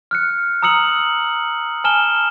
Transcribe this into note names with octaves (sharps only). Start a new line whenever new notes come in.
F6 F#6 C#7
A#5 D#6 E6 C#7 F#7
G#5 A5 F6 E7 G7